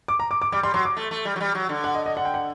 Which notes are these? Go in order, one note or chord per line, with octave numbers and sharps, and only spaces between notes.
D6
A#5
D6
D6
G3 D6
G3 C6
F#3 C6
D6
A3
A3
G3
F#3
G3
F#3
D3
F#5
D#5
D#5
F#5
G5
F#5